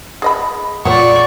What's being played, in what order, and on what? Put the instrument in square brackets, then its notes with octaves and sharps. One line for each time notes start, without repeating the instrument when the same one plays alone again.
[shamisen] G#4 D#5 B5
[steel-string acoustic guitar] A#2 F#5 [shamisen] G#3 C#5 [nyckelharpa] D5 C#6